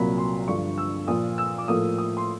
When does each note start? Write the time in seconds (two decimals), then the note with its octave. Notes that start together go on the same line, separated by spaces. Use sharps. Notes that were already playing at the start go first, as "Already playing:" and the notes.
Already playing: C2 A#2 F#3 A#3 B5
0.18 C6
0.48 G2 D3 F3 C#6
0.78 E6
1.08 A#2 F3 A#3 D#6
1.38 E6
1.58 D6
1.68 A2 F3 A#3 D#6
1.98 D#6
2.17 C6